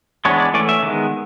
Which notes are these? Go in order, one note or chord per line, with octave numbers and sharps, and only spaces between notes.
E3 G#3 B3 D4 C#5
D5
E3 A3 C#4 D5
E5
D#3 G#3 B3